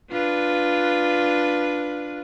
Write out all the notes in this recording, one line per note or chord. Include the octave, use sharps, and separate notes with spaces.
D4 F4 B4